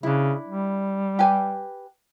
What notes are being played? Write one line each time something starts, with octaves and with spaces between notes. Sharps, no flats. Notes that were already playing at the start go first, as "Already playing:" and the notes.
C#3 D4 E4
G3
G4 B4 G#5